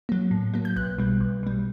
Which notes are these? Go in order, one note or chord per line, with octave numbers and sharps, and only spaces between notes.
F#3 A#3
A2
F#3 A#3
G6
B1 F#6
B2 G3
B1
B2 G3